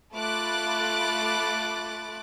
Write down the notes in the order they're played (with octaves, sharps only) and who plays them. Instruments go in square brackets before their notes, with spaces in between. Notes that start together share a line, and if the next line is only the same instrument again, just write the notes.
[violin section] A3 F4 B5 D6 F#6 A6